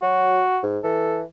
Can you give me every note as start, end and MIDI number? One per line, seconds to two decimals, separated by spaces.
0.02 0.41 54
0.02 0.60 66
0.63 0.79 44
0.84 1.23 52
0.84 1.20 69